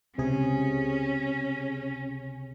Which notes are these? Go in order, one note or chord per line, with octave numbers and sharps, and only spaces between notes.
C#2 C3 C#4 G#4